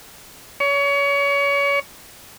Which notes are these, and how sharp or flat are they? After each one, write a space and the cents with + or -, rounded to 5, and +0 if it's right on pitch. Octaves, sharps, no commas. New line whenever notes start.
C#5 +30